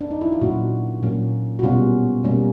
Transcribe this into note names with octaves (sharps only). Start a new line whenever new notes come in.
D4
D#4
E4
F4
A#2 F#3 A#3 C#4 F#4
A#2 F#3 A#3 C#4
F#4
B2 G3 A#3 C#4 F4
B2 G3 A#3 C#4